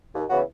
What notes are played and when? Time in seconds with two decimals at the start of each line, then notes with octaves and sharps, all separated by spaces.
0.15 D#2
0.30 C#3 E3 B3 F#4